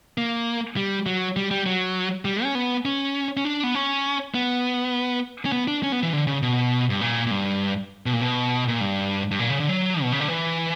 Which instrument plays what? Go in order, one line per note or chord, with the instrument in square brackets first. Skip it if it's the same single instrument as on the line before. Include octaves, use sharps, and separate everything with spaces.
[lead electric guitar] A#3
G3
F#3
G3
G3
F#3
G3
C#4
B3
C#4
C#4
D4
B3
C#4
B3
C#4
B3
D4
C#4
B3
E3
D3
C#3
B2
G2
A#2
A#2
G2
B2
A#2
B2
A#2
G2
G2
A#2
C#3
D3
F#3
B2
C#3
D3
E3